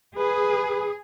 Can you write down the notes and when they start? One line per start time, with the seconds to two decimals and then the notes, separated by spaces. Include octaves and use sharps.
0.17 G#4 B4